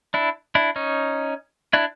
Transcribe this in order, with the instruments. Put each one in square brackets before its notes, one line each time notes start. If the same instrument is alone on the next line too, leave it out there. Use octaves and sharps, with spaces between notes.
[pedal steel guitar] D4 E4
D4 E4
C#4 D#4
D4 E4